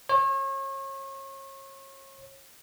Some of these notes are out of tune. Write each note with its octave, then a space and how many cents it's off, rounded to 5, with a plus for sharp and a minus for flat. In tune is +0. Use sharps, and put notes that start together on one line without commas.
C#5 -35